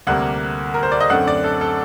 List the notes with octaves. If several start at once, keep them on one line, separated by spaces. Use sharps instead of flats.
D2 C3 G3 A#3 F#5
A#4
C5
D5
D#5
F#2 D3 A3 C4 F#5
D5
A4
A4